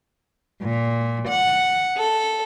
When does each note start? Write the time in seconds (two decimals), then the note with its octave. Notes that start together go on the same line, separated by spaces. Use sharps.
0.62 A#2
1.28 F#5
1.95 A4